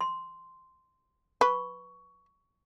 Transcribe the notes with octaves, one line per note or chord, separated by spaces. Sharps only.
C6
B4 C#6